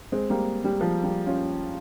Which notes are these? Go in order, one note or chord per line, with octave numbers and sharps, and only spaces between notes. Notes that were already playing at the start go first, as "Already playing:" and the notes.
G#3 C4
G3 A#3
G3
F3
G3
C#4 F4